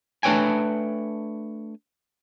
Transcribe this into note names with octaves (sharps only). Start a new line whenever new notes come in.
A3 D4 B4 C#5 G5 G#5